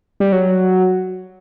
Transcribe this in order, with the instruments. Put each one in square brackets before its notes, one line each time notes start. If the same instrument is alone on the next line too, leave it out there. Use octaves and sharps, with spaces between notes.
[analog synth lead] G3
F#3